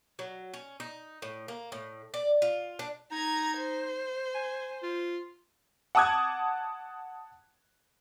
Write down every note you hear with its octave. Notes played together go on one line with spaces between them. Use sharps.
F#3
C#4
D#4
A2
A#3
A2
D5
F4
D4
D#4 A#5 G#6
C5
G#5
F4
F#5 A5 D6 D#6 F#6 G#6